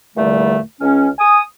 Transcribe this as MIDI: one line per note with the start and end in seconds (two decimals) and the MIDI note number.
0.16 0.58 40
0.16 0.58 46
0.16 0.58 50
0.16 0.58 55
0.16 0.58 57
0.81 1.09 37
0.81 1.09 61
1.18 1.41 80
1.18 1.41 87